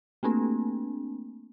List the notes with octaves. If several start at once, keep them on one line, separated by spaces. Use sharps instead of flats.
A3 A#3 C4 D4